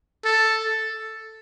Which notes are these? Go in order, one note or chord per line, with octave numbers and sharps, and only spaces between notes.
A4